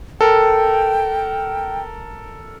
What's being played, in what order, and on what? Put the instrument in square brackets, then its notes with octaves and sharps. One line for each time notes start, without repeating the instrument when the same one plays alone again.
[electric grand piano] A4 A#4 [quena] G5